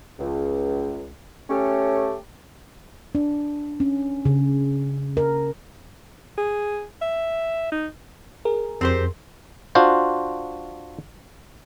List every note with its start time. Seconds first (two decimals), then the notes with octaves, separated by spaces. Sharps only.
0.19 C#2
1.49 A3 C#4 G4 A4
3.15 D4
3.80 C#4
4.25 C#3
5.17 A#4
6.37 G#4
7.02 E5
7.72 D#4
8.45 G#4 A#4
8.81 F2 C4 G4 C5
9.75 D4 F4 F#4 C5